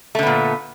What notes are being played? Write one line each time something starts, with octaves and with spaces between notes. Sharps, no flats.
A#2 D3 A3 B3